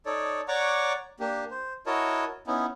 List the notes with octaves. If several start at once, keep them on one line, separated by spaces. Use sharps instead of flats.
D#4 A4 C#5 D5
C#5 D5 F#5 A#5 C#6 D6
A#3 D4 G4
C5
E4 F#4 A#4 C#5 D#5 A5
B3 C#4 D#4 E4